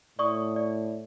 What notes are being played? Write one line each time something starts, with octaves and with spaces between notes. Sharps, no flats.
A2 D5 C#6 D#6
D5